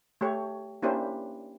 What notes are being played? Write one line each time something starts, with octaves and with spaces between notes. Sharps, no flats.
A3 G4 C#5
A#3 C#4 D4 E4 G4 C5